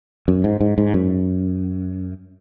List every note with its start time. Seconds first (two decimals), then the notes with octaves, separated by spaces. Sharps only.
0.28 F#2
0.44 G#2
0.61 G#2
0.78 G#2
0.94 F#2